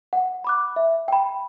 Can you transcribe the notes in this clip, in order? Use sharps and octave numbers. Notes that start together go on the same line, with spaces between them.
F#5
B5 D6 F#6
E5
G5 B5